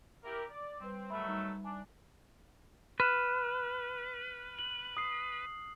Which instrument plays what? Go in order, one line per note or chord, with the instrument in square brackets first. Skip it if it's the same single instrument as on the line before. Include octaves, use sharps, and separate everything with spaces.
[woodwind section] E4 G4 A#4
D5
[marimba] G3 B4 [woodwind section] C4
[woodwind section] D#3 F#3 A3 [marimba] E5 B5
[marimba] G3 D#4
[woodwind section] D4 [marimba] G#5
[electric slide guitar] B4 [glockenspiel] F6 F#6 E7
[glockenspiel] F#7
D#6 C7